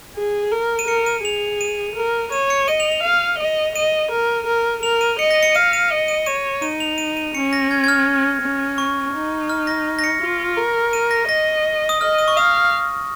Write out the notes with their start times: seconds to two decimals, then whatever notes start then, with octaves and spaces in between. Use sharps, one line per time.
0.17 G#4
0.52 A#4
0.79 D#7
0.88 A#4 C#7
1.06 D#7
1.24 G#4 F7
1.61 D#7
1.96 A#4
2.32 C#5 D#7
2.50 C#7
2.68 D#5 D#7
2.80 F7
2.92 F7
3.04 F5
3.39 D#5
3.76 D#5 D#7
4.12 A#4
4.47 A#4
4.83 A#4 F7
5.01 D#7
5.19 D#5 C#7
5.31 A#6
5.43 C#7
5.55 F5 D#7
5.73 D#7
5.91 D#5
6.08 D#7
6.26 C#5 D#7
6.62 D#4 D#7
6.80 F7
6.98 D#7
7.17 D#7
7.35 C#4 C#7
7.53 A#6
7.71 G#6
7.84 G#6
7.88 F6
8.42 C#4
8.78 C#6
9.14 D#4
9.49 F6
9.67 A#6
9.99 A#6
10.04 C#7
10.22 F4
10.57 A#4
10.93 D#7
11.11 A#6
11.29 D#5 A#6
11.89 D#6
12.01 D#5 F6
12.18 D#6
12.28 C#6
12.36 F5 D#6